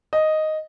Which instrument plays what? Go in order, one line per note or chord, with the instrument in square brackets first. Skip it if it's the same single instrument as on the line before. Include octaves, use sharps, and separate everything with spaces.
[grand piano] D#5